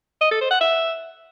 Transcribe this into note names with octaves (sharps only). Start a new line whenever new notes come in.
D#5
A4
C5
F#5
E5